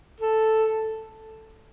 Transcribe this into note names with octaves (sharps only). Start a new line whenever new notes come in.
A4